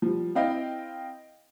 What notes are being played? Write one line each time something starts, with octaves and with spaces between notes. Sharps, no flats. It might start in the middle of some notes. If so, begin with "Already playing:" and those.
F3 G3
C4 E4 D#5 F5 G5